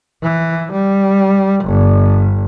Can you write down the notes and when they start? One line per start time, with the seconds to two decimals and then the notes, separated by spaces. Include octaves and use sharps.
0.22 E3
0.72 G3
1.65 G1